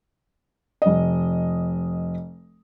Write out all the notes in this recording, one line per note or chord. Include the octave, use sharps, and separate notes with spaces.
F1 D#5